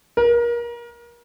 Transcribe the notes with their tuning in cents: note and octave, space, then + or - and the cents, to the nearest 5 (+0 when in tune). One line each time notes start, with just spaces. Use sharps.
A#4 +30